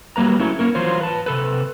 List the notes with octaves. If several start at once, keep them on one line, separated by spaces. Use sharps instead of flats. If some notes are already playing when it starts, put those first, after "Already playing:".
F#3 G3 A#3 B4 A#5
F#3 A3 C#4 E4
A#3 C#4 A#4
E3 F#3 F4 C5 C#5
B4 A5
C3 A4 B4